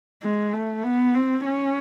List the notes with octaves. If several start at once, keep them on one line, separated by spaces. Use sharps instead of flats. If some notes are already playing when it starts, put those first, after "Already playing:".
G#3
A3
B3
C4
C#4